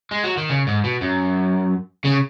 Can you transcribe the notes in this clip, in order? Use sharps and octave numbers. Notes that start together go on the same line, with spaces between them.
G#3
F#3
D#3
C#3
G#2
B2
F#2
C#3